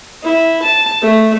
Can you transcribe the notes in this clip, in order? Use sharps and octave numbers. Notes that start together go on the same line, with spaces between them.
E4
A5
A3